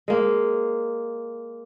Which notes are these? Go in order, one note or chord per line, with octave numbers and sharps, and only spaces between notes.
G#3 A#3